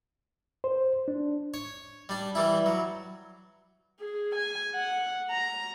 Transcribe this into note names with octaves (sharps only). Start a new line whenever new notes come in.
C5
D4
C#5
G3 D4
E3 G3 E4
F#3
G#4
G#5
F#5
A#5